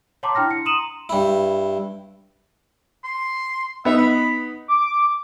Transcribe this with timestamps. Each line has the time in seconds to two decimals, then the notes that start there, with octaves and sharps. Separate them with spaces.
0.23 C#5 F#5 A5 A#5 C6 D6
0.35 D4 E4 G5 F6 A#6
0.50 C#7
0.65 A#5 C6 D#6 D#7 E7 F#7
1.09 G2 E4
3.04 C6
3.85 B3 D#4 E5
3.98 B5
4.68 D6